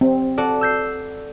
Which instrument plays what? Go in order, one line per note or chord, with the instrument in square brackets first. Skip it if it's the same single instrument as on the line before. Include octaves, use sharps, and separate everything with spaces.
[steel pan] C4
[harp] F#4 A4 D5
E6 G6 C7